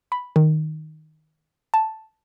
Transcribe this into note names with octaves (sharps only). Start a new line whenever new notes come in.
B5
D#3
A5